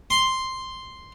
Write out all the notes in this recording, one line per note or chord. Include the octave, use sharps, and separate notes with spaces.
C6